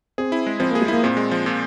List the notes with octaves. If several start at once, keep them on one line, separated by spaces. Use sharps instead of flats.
C4 G#4
E4
G#3
F3 C4
A#3
G#4
G#3
A#3 E4
A#2 C4
G#3
F3
A#2